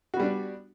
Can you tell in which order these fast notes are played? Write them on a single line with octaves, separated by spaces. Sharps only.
F#4 B3 G3 D4